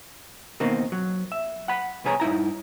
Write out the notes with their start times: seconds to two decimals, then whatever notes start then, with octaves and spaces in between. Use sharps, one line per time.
0.60 B2 D#3 A#3 C4 D#4
0.92 F#3
1.32 E5
1.68 F#5 B5
2.04 C2 B2 B3 G#4 C#5 A#5
2.20 G2 D#4 E4 A#5